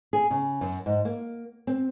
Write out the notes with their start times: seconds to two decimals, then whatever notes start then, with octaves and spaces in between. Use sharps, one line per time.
0.13 G#4
0.31 C#3
0.61 F#2
0.86 G#2
1.05 A#3
1.67 C4